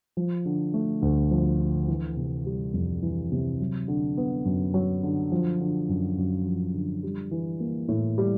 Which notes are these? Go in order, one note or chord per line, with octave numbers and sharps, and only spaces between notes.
F3
D3
A3
D2
F3
D3
E3
C3
G3
F2
E3
C3
F#3
D3
B3
F#2
F#3
D3
F3
D3
F#2
F#2
F3
D3
G3
E3
A#3
A2
G3